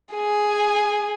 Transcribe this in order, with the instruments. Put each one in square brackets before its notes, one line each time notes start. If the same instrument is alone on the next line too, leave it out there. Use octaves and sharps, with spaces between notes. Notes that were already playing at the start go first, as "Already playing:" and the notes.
[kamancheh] G#4 G#5